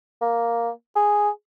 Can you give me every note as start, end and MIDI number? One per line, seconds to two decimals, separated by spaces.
0.21 0.70 58
0.96 1.30 68